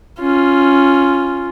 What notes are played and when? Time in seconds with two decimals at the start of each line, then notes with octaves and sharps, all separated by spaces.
0.20 C#4 F4